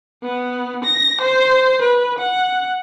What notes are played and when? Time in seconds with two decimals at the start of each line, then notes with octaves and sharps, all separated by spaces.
0.23 B3
0.84 A#6
1.21 C5
1.82 B4
2.19 F#5